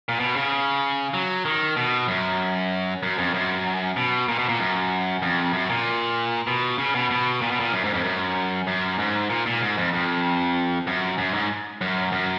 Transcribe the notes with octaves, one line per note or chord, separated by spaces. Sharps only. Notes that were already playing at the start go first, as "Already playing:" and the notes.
A#2
B2
C#3
F#3
D#3
B2
F#2
F#2
F2
F#2
B2
A#2
B2
A#2
F#2
F2
F#2
A#2
B2
C#3
B2
B2
A#2
B2
A#2
F#2
G#2
F2
F#2
F#2
G#2
A#2
A#2
G#2
F2
F2
F#2
F#2
G#2
F#2
F#2